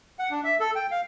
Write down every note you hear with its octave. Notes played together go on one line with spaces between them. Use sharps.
F#5
D4
E5
A4
G5
F5